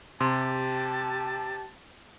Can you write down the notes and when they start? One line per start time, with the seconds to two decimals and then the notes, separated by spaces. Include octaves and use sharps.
0.21 C3 G4 A5 C6